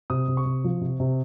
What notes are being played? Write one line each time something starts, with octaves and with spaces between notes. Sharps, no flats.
C3 D#6
C3
C#6
C3
F3
C3
C3